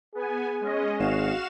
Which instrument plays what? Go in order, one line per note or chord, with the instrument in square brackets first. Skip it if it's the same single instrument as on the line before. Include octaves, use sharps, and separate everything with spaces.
[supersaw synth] B3 G#5 [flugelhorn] G#4
[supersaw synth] G#3 C#4 D#5
[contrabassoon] G#1 [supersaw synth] F#4 F5 E7